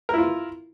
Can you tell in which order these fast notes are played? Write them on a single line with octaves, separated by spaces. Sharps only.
A#4 E4 F4